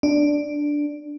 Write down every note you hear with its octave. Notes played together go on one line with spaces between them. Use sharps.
D4